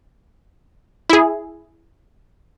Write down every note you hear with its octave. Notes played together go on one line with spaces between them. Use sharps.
E4 G#4